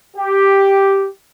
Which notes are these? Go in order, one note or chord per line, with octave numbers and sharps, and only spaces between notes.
G4